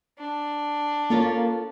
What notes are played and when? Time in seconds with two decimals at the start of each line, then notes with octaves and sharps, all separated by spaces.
0.19 D4
1.10 A#3 C#4 F4 A4